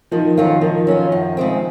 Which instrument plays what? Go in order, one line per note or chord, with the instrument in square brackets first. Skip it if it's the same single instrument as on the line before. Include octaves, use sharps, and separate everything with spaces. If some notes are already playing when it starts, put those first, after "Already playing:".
[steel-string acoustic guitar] D#3 [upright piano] F3
[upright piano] D#3 [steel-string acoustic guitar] F#3 C#4 F4
[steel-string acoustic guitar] D#3 [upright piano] F3
[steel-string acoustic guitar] F#3 C#4 F4
F#2
C#3 G#3 C4